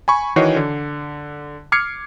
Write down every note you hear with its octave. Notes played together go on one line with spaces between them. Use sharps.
G#5 B5 C#6
D#3 E3 F#4 C#5 D#5 C7
D3
D6 F6 G#6 C7 C#7